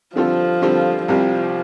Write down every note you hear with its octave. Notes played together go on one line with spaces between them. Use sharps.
D3 F3 G3 C4 F4 A4
D3 G3 C4 F4 A4
C2 C3 F3 G3